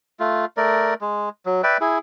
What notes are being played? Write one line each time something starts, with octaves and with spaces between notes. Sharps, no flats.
A3 F4
A3 A#4 D5
G#3
F#3
B4 D5 E5 G5
E4 G#4